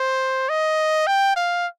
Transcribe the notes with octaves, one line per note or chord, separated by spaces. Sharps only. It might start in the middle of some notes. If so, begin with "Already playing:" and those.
Already playing: C5
D#5
G5
F5